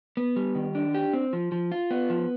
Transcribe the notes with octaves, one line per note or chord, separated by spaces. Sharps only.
B3
G3
D#3
D4
G4
C4
F3
F3
F4
B3
F3